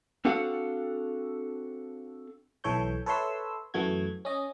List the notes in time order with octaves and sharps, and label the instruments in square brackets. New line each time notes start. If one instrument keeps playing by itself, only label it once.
[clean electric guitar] C4 D4 F#4 A4 F5 F#5
[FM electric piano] B1 E3 A4 C#5 G6
A4 B4 C#5 E5 C6 E6
F#2 E3 A3 F#4 G#6
C#4 D#5